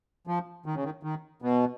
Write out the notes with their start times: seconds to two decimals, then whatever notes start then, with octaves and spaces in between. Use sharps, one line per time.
0.27 F3
0.66 D#3
0.75 C#3
0.84 D#3
1.03 D#3
1.42 B2